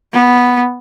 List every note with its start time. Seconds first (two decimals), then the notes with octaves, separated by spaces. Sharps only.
0.13 B3